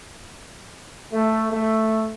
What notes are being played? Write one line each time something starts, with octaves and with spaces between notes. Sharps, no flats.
A3
A3